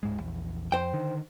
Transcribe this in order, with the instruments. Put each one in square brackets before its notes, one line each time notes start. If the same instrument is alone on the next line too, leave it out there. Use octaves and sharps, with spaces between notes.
[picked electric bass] D1 G#2 G#3
A#1 E2
[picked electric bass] F2 [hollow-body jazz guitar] C5 G5
[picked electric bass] D3 D#3